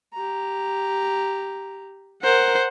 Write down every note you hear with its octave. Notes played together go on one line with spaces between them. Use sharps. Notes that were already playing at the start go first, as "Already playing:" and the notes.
G4 A#5
A#4 C5 F#5